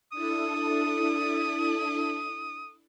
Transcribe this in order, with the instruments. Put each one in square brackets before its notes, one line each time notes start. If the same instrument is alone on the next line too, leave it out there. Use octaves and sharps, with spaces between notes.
[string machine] D4 E4 A4 [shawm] D#6